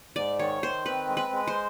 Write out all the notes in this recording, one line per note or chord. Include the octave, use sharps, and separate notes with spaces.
G#2 D5
D#3 C#5
D#3 C5
C4 B4
G#3
B4
G#3
C5